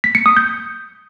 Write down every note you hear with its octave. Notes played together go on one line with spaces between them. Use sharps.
B6
C#7
D#6
G6